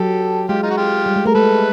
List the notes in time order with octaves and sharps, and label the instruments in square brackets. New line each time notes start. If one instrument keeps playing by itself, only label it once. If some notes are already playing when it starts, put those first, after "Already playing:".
Already playing: [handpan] F#3 [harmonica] G4 A4
[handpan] G#3 [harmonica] F4 G4
[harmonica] D#4 F4
F#4
F4 G4
[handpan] G3
G#3
[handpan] A3 [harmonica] A#4
[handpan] G#3 [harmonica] A4 B4